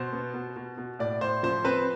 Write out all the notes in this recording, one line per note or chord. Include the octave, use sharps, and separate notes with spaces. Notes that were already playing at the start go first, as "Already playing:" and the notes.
Already playing: B2 C5
B3
B2
B2
B2
A2 D5
A2 C5
F3 C5
C4 B4